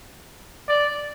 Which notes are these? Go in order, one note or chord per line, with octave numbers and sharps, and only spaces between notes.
D5